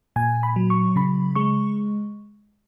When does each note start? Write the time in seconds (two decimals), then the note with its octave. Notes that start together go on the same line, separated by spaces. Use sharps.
0.16 A#2 G#5
0.43 B5
0.56 F#3
0.70 C#6
0.96 C#3 B5
1.35 G#3 C#6